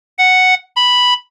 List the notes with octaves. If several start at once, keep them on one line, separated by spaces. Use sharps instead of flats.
F#5
B5